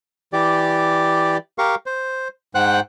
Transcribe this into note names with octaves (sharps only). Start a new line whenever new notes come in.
E3 G4 D5
G4 A#4 F5 C#6
C5
G#2 C5 F#5 G5 F#6